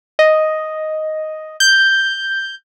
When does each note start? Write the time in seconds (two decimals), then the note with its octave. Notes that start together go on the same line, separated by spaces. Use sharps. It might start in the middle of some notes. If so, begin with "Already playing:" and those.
0.19 D#5
1.60 G6